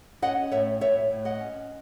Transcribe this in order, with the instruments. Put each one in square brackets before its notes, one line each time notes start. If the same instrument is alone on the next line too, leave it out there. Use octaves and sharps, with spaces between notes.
[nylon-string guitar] C#4 D#5 F#5
A2 C#5 E5
A2 C#5 E5
A2
D#5 F#5
C#4